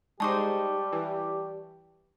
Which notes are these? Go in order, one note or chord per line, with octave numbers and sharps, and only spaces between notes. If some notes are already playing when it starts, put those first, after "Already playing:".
G3 G#3 D#4 G4 C5 A5 C#6 D6
E3